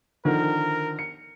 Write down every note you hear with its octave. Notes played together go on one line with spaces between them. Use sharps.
D3 D#3 F3 A#4
C#7